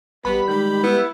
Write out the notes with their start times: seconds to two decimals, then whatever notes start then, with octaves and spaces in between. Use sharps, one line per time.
0.25 A1 G3 B3 B5
0.48 D#3 G#3 G6
0.83 B3 E4